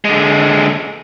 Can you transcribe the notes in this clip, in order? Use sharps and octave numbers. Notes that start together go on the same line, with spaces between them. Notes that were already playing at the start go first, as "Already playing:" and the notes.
D3 G#3